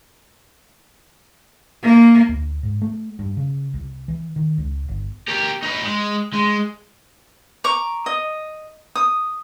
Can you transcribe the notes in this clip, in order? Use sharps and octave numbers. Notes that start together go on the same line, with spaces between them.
A#3
D2
G#2
A3
G2
C#3
C2
E3
D#3
C#2
G1
G4 A#4
D#4 B4
G#3
G#3
A#5 C#6 D6
D#5
D#6